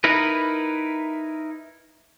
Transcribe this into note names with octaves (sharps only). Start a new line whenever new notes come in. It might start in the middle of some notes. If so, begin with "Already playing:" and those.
D#4 E4 A#4 B4